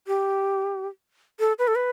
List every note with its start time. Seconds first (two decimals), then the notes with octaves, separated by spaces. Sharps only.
0.07 G4
1.40 A4
1.59 B4
1.68 A4
1.75 B4